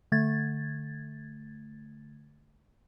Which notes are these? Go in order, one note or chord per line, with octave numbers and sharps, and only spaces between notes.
D3 A3 G#6 A6